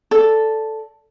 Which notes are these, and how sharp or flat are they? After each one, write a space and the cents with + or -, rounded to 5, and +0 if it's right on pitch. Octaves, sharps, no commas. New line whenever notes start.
A4 +0 D5 -10